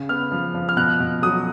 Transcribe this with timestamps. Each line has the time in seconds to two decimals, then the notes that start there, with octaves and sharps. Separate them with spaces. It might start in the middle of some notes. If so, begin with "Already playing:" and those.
Already playing: C#3
0.09 B3 F6
0.32 F3
0.55 F3
0.69 F6
0.77 B2 F#6
1.00 B2
1.23 F#3 D#6